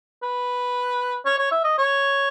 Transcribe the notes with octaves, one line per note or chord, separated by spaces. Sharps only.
B4
C#5
C#5
E5
D#5
C#5